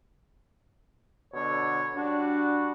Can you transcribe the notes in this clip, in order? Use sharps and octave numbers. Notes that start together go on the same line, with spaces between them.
B2 D3 C#5
G3 D4 F#4